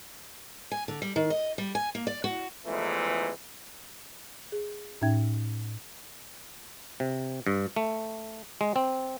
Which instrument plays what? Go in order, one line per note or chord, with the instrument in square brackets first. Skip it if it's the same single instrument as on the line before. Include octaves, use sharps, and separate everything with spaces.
[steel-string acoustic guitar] G#5
D3
G3
D#3
D#5
G3
G#5
A#3
D5
F#4
[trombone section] A1 E2 G#2 E3 F3 A3
[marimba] G#4
A2 C#4 D#4 E5 G5 G#6
[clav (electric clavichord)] C3
G2
A3
G#3
C4